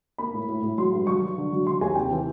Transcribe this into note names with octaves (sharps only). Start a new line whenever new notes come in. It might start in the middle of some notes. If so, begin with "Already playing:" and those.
A#3 B5
A2
A2
A2
F#3 C6
G2
F#3 C#6
F#3
D3
F#3
F#3 C6
D#2 G#5
C3 G5
E3